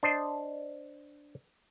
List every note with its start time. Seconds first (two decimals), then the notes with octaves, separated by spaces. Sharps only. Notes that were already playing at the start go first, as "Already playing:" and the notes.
0.03 D4 C5 D#5